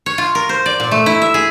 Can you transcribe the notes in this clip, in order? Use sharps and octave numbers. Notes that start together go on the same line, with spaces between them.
C#5
F4
A#4
C5
D5
A#2
A3
E4
E5
G#4